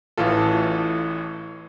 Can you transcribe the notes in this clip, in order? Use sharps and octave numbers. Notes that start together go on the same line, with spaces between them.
A1 A2 E3 F4 A4